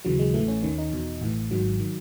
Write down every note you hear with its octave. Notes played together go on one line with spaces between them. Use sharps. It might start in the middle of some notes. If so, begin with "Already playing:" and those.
D#2 C#3 E3 F#3
G#3
A1 A2 E3 A3
C#4
D#2 D#3 C#4
D#4
E2 B2
A1 A2 E3
G#1 G#2 D#3 F#3
D#3